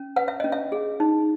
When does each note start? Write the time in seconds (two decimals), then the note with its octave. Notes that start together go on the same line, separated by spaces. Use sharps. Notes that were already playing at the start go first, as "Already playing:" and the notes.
Already playing: C#4
0.16 B4 F#5
0.28 E5
0.40 C#4 D#5
0.52 E5
0.72 G#4
1.00 D#4